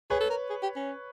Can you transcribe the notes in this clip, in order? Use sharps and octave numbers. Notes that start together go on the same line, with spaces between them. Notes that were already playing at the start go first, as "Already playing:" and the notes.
G#4 B4 C#5
A4
A#4
G#4
G4
C#4